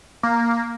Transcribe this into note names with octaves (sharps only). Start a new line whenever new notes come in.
A#3